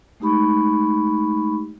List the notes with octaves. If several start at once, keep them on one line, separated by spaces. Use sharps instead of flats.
G#3 A3 D#4 G4 B5 C#6